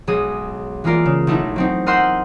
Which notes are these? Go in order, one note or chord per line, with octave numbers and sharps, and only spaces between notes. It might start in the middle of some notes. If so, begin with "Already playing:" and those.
B1 G#3 G#4 D#6
E3 G#3 A#3 F4 A#4 D5
C#3
B1 A3 D#4 E4
F#3 C4 D#4
A#4 D#5 F#5 C6 E6 G6